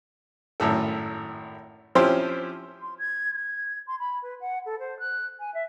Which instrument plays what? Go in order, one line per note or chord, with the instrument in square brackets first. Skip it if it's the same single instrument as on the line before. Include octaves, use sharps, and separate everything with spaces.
[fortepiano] G#1 F#2 A2 A4
F3 C4 C#4 E4 G4 C5
[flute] C6
G#6
G#6
C6
B5
B4
F#5
A4
C5
F#6
G#5
E5